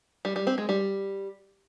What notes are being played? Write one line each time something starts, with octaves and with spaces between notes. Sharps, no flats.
G3
G3
C4
G#3
G3